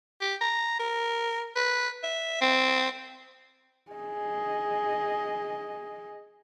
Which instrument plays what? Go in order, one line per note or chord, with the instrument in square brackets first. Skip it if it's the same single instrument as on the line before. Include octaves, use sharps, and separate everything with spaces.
[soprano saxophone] G4
A#5
A#4
B4
E5
C4
[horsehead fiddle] G#4 D#5